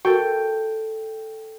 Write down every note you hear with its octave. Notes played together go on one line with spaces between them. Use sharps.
F#4 A4 A#4 G5